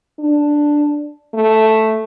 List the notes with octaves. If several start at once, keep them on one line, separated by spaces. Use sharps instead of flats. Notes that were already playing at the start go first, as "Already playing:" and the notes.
D4
A3